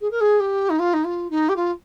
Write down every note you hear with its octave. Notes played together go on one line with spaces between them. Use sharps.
G#4
A#4
G#4
G4
D#4
F4
D#4
F4
D#4
G4
F4